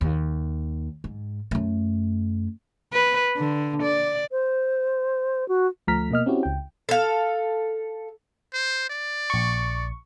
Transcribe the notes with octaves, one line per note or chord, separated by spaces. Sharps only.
D#2
G#2
F#2 A3
B4
D3
D5
C5
F#4
D2 F3 A3 A#5 F6 B6
B2 A#3 D#5 F6
C4 C#4 E4 F#4 G4
C#2 G5
A4 F5
C5
D5
A#1 C#6